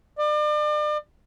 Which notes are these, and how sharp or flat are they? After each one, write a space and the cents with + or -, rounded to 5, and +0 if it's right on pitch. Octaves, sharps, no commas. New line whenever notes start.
D5 +40